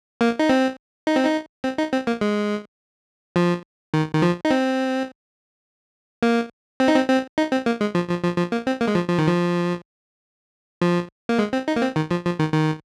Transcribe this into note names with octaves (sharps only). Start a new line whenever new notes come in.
A#3
D#4
C4
D#4
C4
D#4
C4
D#4
C4
A#3
G#3
F3
D#3
D#3
F3
D#4
C4
A#3
C4
D#4
C4
C4
D#4
C4
A#3
G#3
F3
F3
F3
F3
A#3
C4
A#3
G#3
F3
F3
D#3
F3
F3
A#3
G#3
C4
D#4
A#3
C4
D#3
F3
F3
D#3
D#3